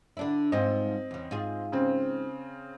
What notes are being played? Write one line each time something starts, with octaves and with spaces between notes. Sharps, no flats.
D3 D4 E4
G#2 F3 C4 D#5
E2 C#3
G#2 F4 G#4
C#3 C4